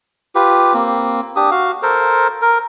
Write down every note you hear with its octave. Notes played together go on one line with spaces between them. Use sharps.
F4 G4 B4
A#3 C4
D4 G4 D#6
F#4 F5
A4 A#4 C5
A#4